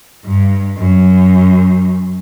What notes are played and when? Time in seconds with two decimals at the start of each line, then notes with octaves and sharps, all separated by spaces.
0.25 G2
0.77 F#2